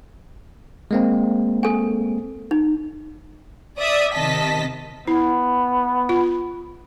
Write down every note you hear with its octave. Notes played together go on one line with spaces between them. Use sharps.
G#3 A#3 C4
A4 G#5
D#4
D5 E5 D#6
C3 D#3 D#5 A5 B6
B3 E4
F4